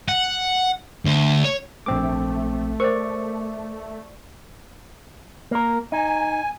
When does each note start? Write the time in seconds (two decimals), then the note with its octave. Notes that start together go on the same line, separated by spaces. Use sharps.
0.09 F#5
1.05 D2
1.44 C#5
1.86 A#1 A3 C4 D6
2.80 A#4 C5 D5 C#6
5.51 A#3 A#4
5.92 D#4 G#5